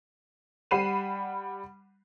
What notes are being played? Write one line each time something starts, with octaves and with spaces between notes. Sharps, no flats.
G3 F#5 B5 C7 D#7 E7